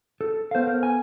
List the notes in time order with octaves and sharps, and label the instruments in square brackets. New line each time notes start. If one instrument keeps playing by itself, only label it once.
[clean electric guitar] A4
[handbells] B3 A4 [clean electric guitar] C5 F5
[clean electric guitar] A#4
G#5